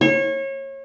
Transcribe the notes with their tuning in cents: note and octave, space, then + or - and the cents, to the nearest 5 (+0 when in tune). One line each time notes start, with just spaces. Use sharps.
C#5 -30